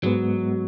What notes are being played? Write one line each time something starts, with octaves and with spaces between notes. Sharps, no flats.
G#2 F#3 G#3 B3